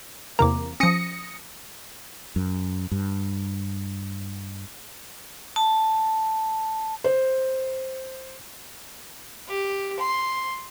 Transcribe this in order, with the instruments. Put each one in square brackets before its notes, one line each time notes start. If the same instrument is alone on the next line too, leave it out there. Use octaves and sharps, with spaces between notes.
[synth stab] E2 C3 A#3 [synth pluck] A#5 D6
[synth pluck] F3 C#4 [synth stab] D#6 A#6 C#7
[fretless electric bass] F#2
G2
[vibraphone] A5
[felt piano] C5
[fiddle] G4
C6